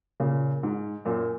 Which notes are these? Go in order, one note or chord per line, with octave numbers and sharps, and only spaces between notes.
A#2 C#3
G#2
F#2 A#2